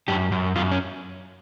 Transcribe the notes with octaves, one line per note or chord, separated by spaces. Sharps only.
F#2 G4
F#2
F#2 F4
C#4